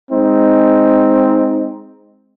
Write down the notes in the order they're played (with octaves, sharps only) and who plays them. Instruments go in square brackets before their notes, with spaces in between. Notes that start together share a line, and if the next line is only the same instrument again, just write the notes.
[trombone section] G#3 C4 D#4